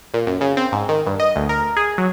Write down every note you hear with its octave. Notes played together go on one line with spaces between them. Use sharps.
A#2
F#2
C#3
C4
G#2
D#3
G2
D#5
D2
A#4
G#4
F#3